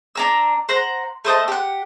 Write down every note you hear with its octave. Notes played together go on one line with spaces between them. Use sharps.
D4 A#5 E6
C5 F#5 A#5
A3 C5 D#5 A5
G4 F#5